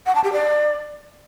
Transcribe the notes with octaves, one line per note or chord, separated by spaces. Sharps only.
F#5
A5
G4
D5